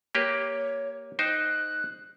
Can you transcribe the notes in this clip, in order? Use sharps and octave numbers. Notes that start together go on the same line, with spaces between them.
A#3 G4 B4 C#5
D#4 C5 G5 F#6